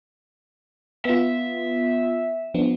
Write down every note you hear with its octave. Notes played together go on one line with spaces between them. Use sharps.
B3 F4 E5
F3 B3 D4